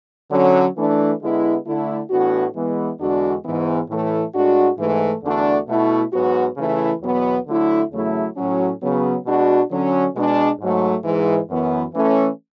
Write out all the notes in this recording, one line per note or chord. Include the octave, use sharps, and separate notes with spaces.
D3 F#3 C#4
E3 A3 D4
D3 G#3 B3 E4
D3 A3 E4
A2 E3 B3 D4 F#4
E3 G#3 B3
E2 D3 G#3 D4 F#4
G#2 E3 B3
A2 E3 A3
A2 G#3 D4 F#4
G#2 E3 A3
E2 D3 A3 D4 F#4
B2 A3 E4
G#2 F#3 B3 F#4
C#3 E3 A3 E4
E2 B2 F#3 B3
D3 F#3 A3 E4
E2 C#3 F#3 A3 E4
A2 F#3 C#4
C#3 F#3 B3
B2 G#3 D4 F#4
D3 F#3 C#4
B2 G#3 D4
G#2 F#3 A3
G#2 E3 G#3
F#2 E3 B3
E3 A3 C#4